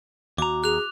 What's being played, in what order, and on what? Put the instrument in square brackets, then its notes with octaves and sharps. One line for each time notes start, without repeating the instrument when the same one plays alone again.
[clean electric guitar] D#2 A#5 [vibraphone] F#4 [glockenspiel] D6
[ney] G#4 [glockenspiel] F#6 F7